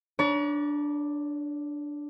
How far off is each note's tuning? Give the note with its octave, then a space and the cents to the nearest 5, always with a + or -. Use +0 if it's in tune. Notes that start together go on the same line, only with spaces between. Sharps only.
D4 +0 C#5 +40 A#5 +45